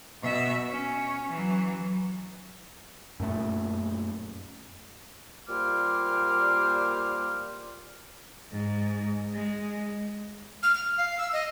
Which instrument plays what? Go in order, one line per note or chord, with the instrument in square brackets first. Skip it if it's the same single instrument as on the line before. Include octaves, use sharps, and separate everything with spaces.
[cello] B2 E5
C#4
E3 F#3
[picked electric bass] F#2 A#2 A3
[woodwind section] A#2 G3 A#3 C5 D6 F6
[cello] G#2
G#3
[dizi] F6
F6
F5
E6
D#5